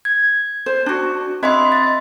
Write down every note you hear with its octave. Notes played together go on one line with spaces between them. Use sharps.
G#6
C5
D4 F#4
C4 C#5 D#5 E5 B5 C6
A6